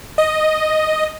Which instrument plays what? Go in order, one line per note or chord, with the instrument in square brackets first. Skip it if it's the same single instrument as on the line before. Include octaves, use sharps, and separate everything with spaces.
[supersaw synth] D#5